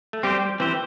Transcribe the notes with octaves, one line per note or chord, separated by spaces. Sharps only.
A3
G3 C4 G4 C5
E3 C4 G4 C5